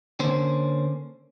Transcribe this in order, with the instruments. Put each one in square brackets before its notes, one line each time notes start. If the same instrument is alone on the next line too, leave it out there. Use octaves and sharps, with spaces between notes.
[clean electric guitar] D3 A#3 C#4 C5